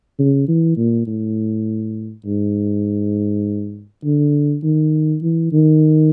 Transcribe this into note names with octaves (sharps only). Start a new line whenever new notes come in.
C#3
E3
A#2
A2
G#2
D3
D#3
E3
D#3